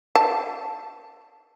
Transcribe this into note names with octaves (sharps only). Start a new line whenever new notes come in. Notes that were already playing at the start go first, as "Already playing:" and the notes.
A5